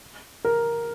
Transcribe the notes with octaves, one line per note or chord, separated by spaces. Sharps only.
A#4